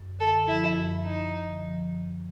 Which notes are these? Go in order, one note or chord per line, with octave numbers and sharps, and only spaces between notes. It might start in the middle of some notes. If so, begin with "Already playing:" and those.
Already playing: F#2
D3 A4
F3 E4
F#2
F#2 D#4
D3
F3
F#2